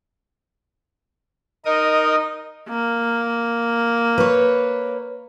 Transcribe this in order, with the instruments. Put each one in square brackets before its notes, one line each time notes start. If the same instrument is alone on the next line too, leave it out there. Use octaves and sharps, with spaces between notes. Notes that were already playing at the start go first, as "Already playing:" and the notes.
[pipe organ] D#4 A#4 D#6 [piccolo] D#5
[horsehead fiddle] A#3
[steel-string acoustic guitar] B4 C#5